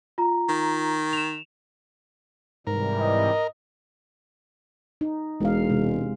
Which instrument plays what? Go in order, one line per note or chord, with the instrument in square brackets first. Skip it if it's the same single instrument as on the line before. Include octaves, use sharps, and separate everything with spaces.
[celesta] F4 A#5
[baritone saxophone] D#3
[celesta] E7 F7
[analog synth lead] G#2 [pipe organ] C3 E3 G3 [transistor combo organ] A#4
[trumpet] D#5
[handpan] D#4
[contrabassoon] E1 [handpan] G#3 F5
[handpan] C3 G#3